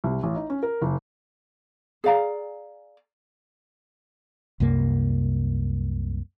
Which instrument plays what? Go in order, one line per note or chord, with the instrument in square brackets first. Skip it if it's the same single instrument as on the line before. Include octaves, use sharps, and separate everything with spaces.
[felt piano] C2
A1
D#4
C#4
A#4
F#1
[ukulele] G#4 D5 F5 A#5
[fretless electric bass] C2 F#2 C3 A#3